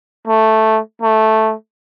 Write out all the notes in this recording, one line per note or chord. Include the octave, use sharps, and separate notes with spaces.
A3
A3